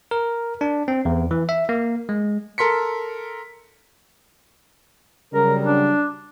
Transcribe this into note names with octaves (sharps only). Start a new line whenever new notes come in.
A#4
D4
C4
E2
E3
E5
A#3
G#3
A4 A#4 C6 B6 C#7
C#3 F#3 G3 A#4
D4